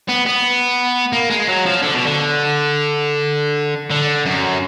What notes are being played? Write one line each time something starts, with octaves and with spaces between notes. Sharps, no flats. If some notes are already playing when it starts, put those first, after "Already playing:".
B3
B3
A#3
G#3
F#3
F3
D3
B2
D3
D3
F#2